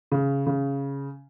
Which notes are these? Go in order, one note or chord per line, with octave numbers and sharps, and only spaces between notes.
C#3
C#3